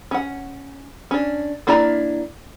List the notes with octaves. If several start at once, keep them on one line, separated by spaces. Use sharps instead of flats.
C#4 F#5
C#4 D4
A#3 D4 E4 D5 A#5